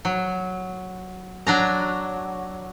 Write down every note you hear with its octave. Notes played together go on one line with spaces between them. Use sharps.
F#3
F#3 D4 A#5